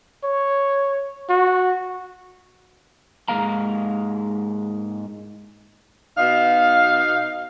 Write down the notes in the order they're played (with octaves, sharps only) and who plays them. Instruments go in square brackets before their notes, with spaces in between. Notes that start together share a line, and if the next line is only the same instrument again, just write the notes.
[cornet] C#5
F#4
[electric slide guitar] G#2 G#3 A#3 F5 A#5
[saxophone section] B2 D#4 F5